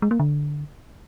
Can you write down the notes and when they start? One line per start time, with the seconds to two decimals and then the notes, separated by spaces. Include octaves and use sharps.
0.02 G#3
0.11 A#3
0.20 D3